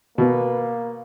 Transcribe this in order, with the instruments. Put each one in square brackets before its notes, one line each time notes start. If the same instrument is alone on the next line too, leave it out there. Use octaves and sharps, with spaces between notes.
[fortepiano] B2 [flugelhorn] A#3 [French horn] B4